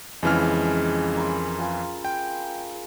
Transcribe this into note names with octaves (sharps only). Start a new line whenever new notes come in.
F2 C#3 E3 G#3 F6
A#4 B5 C6
F4 G#4 F5
G5